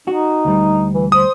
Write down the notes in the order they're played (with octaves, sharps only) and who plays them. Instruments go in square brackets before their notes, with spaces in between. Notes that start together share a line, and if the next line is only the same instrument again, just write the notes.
[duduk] D#4 [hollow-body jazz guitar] F#4
[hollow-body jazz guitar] D2 G3
[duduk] E3
[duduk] C5 [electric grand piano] D#6